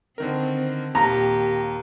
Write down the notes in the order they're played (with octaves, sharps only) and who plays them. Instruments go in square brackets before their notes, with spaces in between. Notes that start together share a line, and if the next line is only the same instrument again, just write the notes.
[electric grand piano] D3 D#3 A#4 [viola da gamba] C4
[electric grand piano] D#2 [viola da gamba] A#2 G4 [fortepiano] A#5